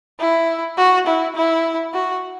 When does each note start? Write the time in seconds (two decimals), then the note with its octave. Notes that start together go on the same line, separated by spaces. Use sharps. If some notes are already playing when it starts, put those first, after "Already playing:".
0.20 E4
0.78 F#4
1.07 E4
1.36 E4
1.94 F#4